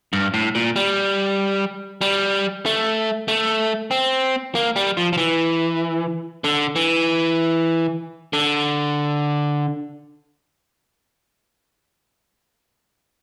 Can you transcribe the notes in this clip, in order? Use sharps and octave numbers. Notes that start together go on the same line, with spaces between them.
G2
A2
A#2
G3
G3
A3
A3
C4
A#3
G3
F3
F3
E3
D3
E3
D3